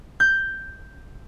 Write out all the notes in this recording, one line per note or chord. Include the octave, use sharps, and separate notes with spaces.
G6